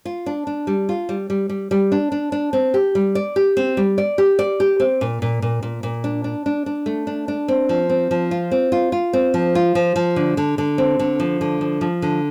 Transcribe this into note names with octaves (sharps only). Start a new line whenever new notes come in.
F4
D4
D4
G3
F4
G3
G3
G3
G3
D4
D4
D4
C4
G4
G3
D5
G4
C4
G3
D5
G4
D5
G4
C4
A#2
A#2
A#2
A#2
A#2
D4
D4
D4
D4
A3
D4
D4
C4
F3
C4
F3
F4
C4
F4
F4
C4
F3
F4
F3
F3
D3
D3
D3
C4
D3
F3
D3
F3
F3
D3